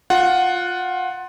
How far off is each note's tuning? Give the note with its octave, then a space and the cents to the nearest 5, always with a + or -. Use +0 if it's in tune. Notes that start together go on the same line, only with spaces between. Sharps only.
F4 +20 F#5 +0